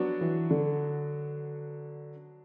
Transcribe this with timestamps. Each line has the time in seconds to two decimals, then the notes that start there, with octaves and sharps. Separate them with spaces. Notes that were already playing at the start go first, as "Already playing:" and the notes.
Already playing: F#3 B3 D4 F#4
0.21 E3
0.50 D3